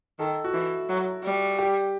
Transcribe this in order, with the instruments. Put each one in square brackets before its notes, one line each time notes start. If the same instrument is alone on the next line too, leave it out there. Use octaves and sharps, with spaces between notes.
[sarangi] D#3 [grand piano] A4
[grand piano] F#4
[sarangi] E3 [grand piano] E4
[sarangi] F#3
G3
[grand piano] G4